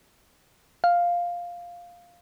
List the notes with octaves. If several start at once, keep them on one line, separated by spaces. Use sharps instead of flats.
F5